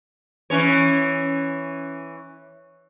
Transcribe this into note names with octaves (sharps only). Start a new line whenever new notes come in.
E3 C#4 C#5